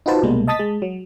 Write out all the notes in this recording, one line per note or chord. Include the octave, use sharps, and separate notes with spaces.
D#4 F4 F#4 B4 C5 A5
C2 B2 G3 G#3 A#3
D#5 A5 D#6 A6 B6
G#3
F#3